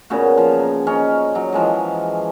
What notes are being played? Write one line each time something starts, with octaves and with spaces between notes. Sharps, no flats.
A#2 C#3 B3 F#4
F3
A#5
C#4 D#4 C#5 D#5
F#3
E3 F3 G#3 D#5